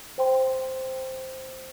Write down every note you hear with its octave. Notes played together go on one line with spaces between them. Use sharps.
C5 G5 C6